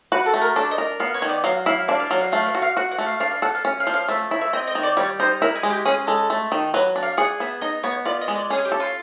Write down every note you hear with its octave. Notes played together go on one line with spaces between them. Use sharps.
F#4 B4
A4
A3
A#4
D4 A4
D#5
A#4
B3 F5
C#5
D#3
D5
F#3 F5
E4 F5
D4 F5
F5
F#3 F5
F5
A3 F5
F5
F#4
F5
F#4 F#5
F#5
A3
F5
D4 F5
F5
A4 F#5
F5
C#4
F5
F3
F5
A3 E5
E4
E5
C4 D#5
D#5
D#3
D5
G3 C#5
D#4 C5
E4 A#4
G#4
G#3
G4
C#4 G#4
G#3 A4
A3
D#3
F#3 B4
D4
F5
G#4 F#5
B3 E5
D#4 D#5
B3 C#5
F4 D5
D#5
G#3
D5
C#4 G#4
G4
A4
F4